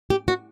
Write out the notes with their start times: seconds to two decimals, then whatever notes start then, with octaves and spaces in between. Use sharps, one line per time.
0.10 G4
0.28 F#4